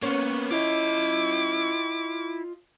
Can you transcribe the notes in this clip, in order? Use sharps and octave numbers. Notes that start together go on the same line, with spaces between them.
A#3 B3 C#4 C5
E4 F4 D#5 D6